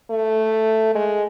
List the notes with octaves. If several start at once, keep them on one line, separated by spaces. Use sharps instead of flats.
A3
G#3